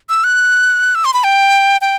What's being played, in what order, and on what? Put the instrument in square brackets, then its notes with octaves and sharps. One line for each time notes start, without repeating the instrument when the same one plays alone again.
[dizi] E6
F#6
E6
C6
B5
G5
G5